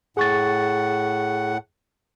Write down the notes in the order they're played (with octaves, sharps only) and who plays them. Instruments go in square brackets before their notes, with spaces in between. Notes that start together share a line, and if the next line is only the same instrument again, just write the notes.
[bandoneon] A2 F#5 [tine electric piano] G#4 C#6 A6